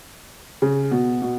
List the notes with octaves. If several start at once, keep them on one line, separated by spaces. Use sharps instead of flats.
C#3
B2
B2